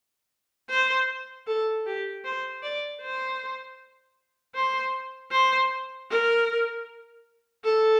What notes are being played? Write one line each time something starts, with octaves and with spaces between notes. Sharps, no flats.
C5
A4
G4
C5
D5
C5
C5
C5
A#4
A4